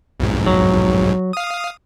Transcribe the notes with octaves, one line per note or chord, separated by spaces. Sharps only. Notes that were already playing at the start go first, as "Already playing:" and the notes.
B1 F2 G#2
F#3
F5 D#6